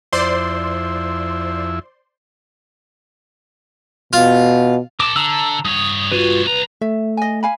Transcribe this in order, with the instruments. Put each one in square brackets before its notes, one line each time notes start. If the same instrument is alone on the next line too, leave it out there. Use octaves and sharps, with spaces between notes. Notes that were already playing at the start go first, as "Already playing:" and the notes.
[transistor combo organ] F2 E4 [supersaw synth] C5 D5 C6
[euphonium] B2 [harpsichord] F4
[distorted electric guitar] A#4 A5 [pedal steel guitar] D6
[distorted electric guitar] D3 [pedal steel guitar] A5 A#5 E6
[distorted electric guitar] G2 C#5 [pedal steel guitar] D#6
[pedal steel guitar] F4 F#4 B4
[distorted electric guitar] C2 A#5 [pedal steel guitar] B4
[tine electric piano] A3 [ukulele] E5
[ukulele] D#5 G#5
F5 G#5 B5